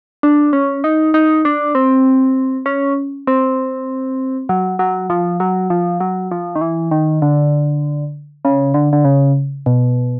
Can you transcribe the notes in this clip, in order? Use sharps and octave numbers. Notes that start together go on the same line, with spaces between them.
D4
C#4
D#4
D#4
D4
C4
C#4
C4
F#3
F#3
F3
F#3
F3
F#3
F3
D#3
E3
D#3
D3
C#3
D3
D3
C#3
B2